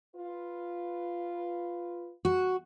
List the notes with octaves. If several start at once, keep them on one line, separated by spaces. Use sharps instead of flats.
F4 B4
F#4